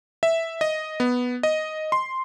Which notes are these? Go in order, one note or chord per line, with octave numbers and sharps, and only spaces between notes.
E5
D#5
B3
D#5
C6